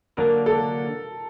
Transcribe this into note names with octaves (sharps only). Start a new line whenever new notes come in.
D3 F#3 A#3 D4 A#4
A4